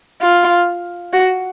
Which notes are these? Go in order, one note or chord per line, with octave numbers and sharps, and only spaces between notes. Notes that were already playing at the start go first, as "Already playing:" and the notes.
F4
F#4